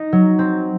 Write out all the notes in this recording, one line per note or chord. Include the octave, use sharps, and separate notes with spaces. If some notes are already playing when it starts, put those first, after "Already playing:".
Already playing: D#4
F#3
C4